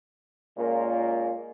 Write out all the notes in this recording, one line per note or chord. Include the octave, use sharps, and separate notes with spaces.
A#2 G#3 A#3 C#4 F4 A#4